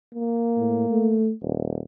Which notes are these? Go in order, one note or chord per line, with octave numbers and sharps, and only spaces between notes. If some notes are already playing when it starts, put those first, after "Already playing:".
A#3
A2
A3
D#1